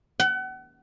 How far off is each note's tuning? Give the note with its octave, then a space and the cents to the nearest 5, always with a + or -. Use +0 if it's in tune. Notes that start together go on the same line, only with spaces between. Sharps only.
F#5 +35